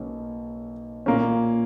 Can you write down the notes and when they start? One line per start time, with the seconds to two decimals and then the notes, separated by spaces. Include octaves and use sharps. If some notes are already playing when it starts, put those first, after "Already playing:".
Already playing: B1 B2 A#3 C#4
1.06 A#2 A#3 C#4